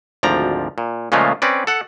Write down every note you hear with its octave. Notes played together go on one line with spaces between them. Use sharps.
G#1 D2 F3 D5 A#5
A#2
A#2 C#3 F3 G#3 A3 F4
C4 C#4 B4 D5
A4 F#5